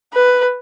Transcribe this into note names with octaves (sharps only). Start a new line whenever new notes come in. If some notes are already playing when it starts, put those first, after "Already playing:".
B4